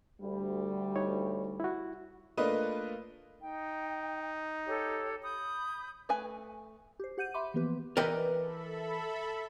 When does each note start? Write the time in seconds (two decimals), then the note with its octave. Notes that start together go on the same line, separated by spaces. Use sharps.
0.22 D2 G3
0.95 D#4 C#5
1.60 E4 F#4
2.37 A3 A#3 D4 F4 B4 D#5
3.42 D#4 G5
4.68 G4 A4 C#5
5.23 B5 D#6 G6
6.09 A3 B4 G#5
7.00 G4 C5
7.18 G4 F#5 G6 D#7
7.34 E5 B5 C6 D6
7.54 E3 F3 A#3 B3 G4 B4
7.97 E3 A#4 B4 D5 D#5 G5
8.38 A4 E5 B5